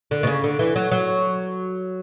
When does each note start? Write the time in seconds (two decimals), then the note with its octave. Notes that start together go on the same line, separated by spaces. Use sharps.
0.11 D3
0.23 B2
0.27 C#3
0.44 D3
0.59 E3
0.76 F#3
0.92 F#3